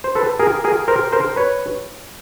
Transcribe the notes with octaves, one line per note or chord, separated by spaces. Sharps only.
C5
A4 B4
G#4 A#4
G#4 A#4
A#4 C5
A#4 C5
B4 C#5